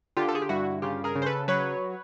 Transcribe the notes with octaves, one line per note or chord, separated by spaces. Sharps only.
D3 F4 G4
A4
G#4
G4
G2 E4 F#4
C#3 F4 G4
G#4 A#4
C#3
C5
A4 B4
F#3 B4 C#5